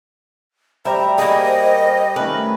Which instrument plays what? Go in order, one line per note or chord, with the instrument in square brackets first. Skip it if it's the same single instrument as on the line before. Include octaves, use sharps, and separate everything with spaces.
[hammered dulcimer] G3 G4 G5 [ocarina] C5 [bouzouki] E5 [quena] A#5
[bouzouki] A#3 G#4 [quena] D#5
[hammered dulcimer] D#3 A3 C#4 [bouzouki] B4